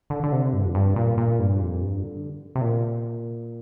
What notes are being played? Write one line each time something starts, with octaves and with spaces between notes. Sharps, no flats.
D3
D3
C3
G2
F2
G2
A#2
A#2
G2
F2
G2
D3
C3
A#2